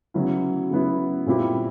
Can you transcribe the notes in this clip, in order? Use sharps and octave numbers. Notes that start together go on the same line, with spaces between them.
C#3 F#3 B3 E4
C#3 F#3 B3 E4
A#2 G3 C4 E4 G4